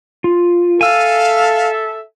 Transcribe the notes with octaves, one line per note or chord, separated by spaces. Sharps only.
F4
A4 E5 F5 G#5 E6